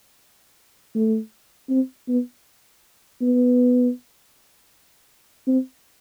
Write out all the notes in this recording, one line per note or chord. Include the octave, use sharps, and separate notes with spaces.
A3
C4
B3
B3
C4